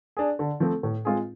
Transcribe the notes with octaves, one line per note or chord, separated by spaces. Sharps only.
D4 G#4
D3
F3 A3 C4
A2
G#3 C4 F4 G#4